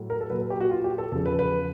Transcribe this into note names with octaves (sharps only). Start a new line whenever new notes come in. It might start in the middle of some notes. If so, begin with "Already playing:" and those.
Already playing: A2 F#3
A#4
A4
A#2 F#3 B4
B4
G4
F#4
F4
G4
A4
E2 C#3 F3 A4
B4
B4